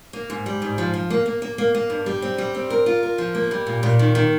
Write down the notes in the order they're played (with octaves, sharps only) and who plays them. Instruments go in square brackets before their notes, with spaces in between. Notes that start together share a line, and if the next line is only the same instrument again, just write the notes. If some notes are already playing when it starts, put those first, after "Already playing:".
[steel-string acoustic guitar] A#3
G#2
G3
G#2
F3
F3
A#3
A#3
A#3
A#3
A#3
G2
G3
C4
G3
C4
A#4
F4
A#4
F3
A#3
G3
A#2
A#2
D#3
D#3